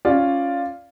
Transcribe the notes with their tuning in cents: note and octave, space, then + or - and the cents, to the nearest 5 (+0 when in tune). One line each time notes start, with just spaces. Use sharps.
C#4 +0 F4 +0 D5 +0